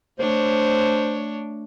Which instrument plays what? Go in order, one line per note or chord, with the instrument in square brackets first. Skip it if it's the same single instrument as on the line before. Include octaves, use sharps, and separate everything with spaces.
[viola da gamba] A3 D4 C#5 [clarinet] C5